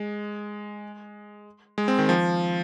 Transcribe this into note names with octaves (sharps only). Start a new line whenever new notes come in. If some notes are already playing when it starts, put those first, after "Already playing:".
Already playing: G#3
G#3
C4
D#3
F3